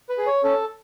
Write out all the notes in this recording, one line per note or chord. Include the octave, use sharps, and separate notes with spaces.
B4
G#4
C#5
C#4 A4